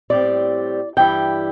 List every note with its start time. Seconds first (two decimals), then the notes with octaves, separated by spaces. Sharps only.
0.10 A2 G3 C4 D5
0.97 G2 E3 G3 E4 G5